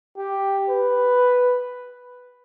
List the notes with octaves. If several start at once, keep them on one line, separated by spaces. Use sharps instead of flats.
G4
B4